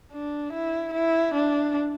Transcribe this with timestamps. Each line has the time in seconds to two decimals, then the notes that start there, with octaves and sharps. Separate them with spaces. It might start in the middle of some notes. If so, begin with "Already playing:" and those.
0.13 D4
0.53 E4
0.93 E4
1.34 D4